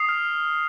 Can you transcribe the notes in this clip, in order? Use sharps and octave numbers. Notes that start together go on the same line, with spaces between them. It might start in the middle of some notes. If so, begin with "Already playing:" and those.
Already playing: D#6 C7
F6